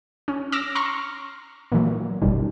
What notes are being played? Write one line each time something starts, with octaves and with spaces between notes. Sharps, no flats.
C#4
D6 E6 F6 A#6
A#5 C6 C#6 F6 A#6
A#2 D#3 E3 F#3
G1 C2 F#2 B2 D#3 G3